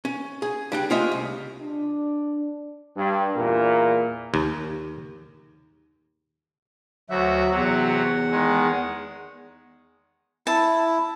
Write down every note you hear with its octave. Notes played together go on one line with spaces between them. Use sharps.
C#4
G#4
G3 D4 G5
A3 C#4 F4 C5 D#5 E5
C2
D4
G2
E2 A#2 A#4
D#2
D2 F#3 F#4 E5
E2 C3 F#3 F#5
D#3 G#3
E4 A5